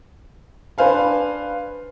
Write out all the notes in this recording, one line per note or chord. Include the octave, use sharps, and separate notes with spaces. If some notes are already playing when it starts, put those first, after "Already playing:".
D4 B4 C5 F5 G#5